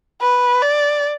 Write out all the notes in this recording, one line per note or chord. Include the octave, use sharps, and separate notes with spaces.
B4
D5